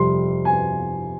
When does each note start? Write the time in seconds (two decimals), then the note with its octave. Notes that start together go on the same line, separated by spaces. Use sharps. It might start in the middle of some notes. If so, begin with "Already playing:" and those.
Already playing: F2 C3 G3 C4 C6
0.45 G#5